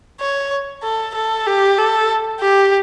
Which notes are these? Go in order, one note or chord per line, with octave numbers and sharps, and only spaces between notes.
C#5
A4
A4
G4
A4
G4